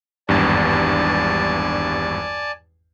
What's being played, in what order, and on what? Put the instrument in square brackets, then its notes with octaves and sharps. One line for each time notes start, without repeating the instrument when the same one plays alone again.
[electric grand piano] G#1 E2 G2 [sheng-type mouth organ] D5 G#5 A5